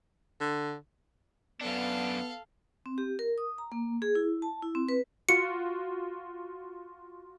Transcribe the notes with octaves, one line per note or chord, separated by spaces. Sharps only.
D3
F#2 B3 D4 A4 F5
C4
G4
A#4
D#6
A#5
A#3
G#4
E4
A5
E4
C4
B4
F4 F#4 C#7